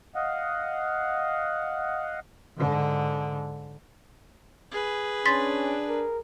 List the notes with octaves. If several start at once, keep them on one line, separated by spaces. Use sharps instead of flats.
D#5 F5 F#5
G#2 D3
G#4 B4
C#4 D4 C6 A6 B6
A#4